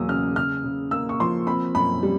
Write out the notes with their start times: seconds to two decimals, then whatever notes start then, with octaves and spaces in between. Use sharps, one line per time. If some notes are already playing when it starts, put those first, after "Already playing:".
Already playing: E2 F#3 A#3 D#6 E6
0.09 C#3 F6
0.36 C#3 F6
0.64 C#3
0.91 A#3 E6
1.09 C#6
1.20 F3 C6
1.47 C4 B5
1.75 F#2 B5
2.03 G3